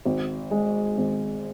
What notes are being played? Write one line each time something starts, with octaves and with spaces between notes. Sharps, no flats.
G#1
G#3
G#1